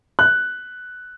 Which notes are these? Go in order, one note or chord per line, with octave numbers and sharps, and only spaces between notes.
F#6